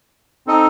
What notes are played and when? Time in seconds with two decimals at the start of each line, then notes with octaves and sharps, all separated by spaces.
0.47 C4 D#4 A4 D#5